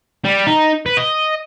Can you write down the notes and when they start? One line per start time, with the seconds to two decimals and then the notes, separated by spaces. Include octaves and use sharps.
0.25 G3
0.47 D#4
0.86 B4
0.97 D#5